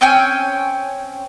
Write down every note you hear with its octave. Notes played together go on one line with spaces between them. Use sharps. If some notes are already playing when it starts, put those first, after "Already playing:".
C4 C#4 G5 G#5